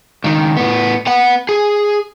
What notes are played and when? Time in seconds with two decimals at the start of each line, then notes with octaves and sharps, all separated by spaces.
0.24 C#2 D#3
0.57 A2 B3
1.07 B3 F#5
1.49 G#4